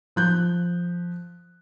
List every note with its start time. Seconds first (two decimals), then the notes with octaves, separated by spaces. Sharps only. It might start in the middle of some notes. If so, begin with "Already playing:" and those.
0.16 F3 F#6 G6